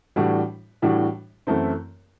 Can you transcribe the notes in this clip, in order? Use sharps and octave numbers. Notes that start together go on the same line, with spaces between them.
A2 E3 G3 D4 F#4
A2 E3 G3 D4 F#4
F#2 E3 A3 C4 E4